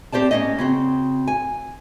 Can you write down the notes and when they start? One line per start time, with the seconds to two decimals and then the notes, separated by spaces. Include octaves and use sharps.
0.12 C4 G4 C5 D5 A5
0.31 A#3 C#4 D#5
0.59 C#3 C4 F#4
1.28 G#5